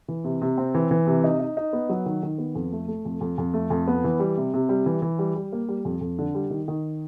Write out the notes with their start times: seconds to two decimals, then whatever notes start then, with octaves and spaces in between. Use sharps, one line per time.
0.08 E3
0.24 C3
0.42 C3
0.58 C4
0.75 E3
0.91 E3
1.07 C3
1.24 D#4
1.40 D#4
1.57 D#4
1.73 B3
1.89 F#3
2.06 D#3
2.23 D#3
2.38 B3
2.55 F2
2.72 A3
2.88 A3
3.05 F2
3.21 F2
3.38 F2
3.54 A3
3.70 F2
3.88 B3
4.04 E3
4.20 G3
4.37 C3
4.54 C3
4.69 G3
4.86 E3
5.02 E3
5.19 G3
5.36 G3
5.53 A#3
5.69 G3
5.85 F2
6.01 F2
6.19 D3
6.35 G3
6.50 D#3
6.68 D#3